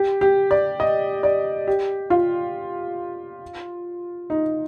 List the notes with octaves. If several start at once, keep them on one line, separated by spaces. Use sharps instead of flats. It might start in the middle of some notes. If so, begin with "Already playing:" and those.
Already playing: G4
G4
D5
D#5
D5
G4
F4
D#4